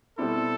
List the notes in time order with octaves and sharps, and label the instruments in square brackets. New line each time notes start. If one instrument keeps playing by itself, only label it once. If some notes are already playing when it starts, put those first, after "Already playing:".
[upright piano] B2 G3 C4 E4 [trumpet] A4